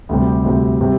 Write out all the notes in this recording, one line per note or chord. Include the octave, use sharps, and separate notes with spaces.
D2 C3 G3
D2 C3 G3
C3 G3